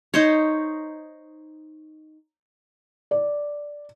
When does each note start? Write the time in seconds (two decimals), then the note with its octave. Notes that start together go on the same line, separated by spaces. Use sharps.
0.14 D#4 C5 C#5
3.11 D5